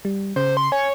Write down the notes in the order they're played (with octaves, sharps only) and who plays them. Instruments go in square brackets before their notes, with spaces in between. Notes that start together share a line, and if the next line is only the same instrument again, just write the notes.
[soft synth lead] G3
[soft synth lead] C#3 [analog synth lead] C5
[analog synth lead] C6
[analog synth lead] C#5 [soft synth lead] G#5